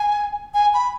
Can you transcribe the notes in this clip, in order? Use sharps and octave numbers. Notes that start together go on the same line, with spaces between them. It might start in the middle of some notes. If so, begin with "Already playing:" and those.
Already playing: G#5
G#5
B5